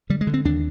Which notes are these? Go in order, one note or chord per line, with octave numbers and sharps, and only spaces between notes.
D3 G3
G#3
D3
C4
D#2 D4